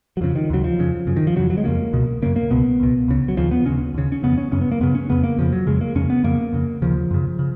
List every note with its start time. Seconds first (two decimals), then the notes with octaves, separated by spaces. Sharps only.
0.17 F#3
0.21 F2 C#3 F3
0.35 D#3
0.50 D#2 C#3 F#3
0.64 F3
0.79 F2 C#3
1.07 F#2 C#3
1.17 D#3
1.27 F3
1.36 F2 C#3 F#3
1.50 F#3
1.58 G#3
1.64 F2 C#3 A#3
1.93 C#2 B2
2.22 F#2 C#3 A#3
2.36 A#3
2.50 C#2 B2 B3
2.80 C#2 B2
3.08 C#2 C#3
3.28 F#3
3.37 D#2 C#3 F3
3.51 B3
3.66 D#2 C#3 C#4
3.94 D#2 C#3
4.12 C#4
4.23 F2 C#3 B3
4.38 C#4
4.52 F#2 C#3 C#4
4.61 B3
4.71 A#3
4.81 F#2 C#3 B3
4.95 C#4
5.09 F2 C#3 B3
5.24 A#3
5.38 F2 C#3 F3
5.53 F#3
5.67 F2 C#3 G#3
5.81 A#3
5.95 F2 C#3 C#4
6.10 B3
6.24 F2 C#3 A#3
6.53 F2 C#3
6.82 D#2 C#3 F3
7.11 F#2 C#3
7.39 C#3